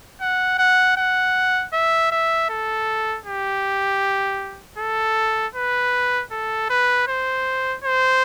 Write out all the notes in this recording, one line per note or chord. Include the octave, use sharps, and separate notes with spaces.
F#5
F#5
F#5
E5
E5
A4
G4
A4
B4
A4
B4
C5
C5